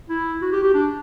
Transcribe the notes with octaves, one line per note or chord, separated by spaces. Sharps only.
E4
F#4
G4
G4
D4